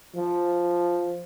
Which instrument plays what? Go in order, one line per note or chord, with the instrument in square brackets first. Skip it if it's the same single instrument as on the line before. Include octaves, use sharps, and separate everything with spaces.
[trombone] F3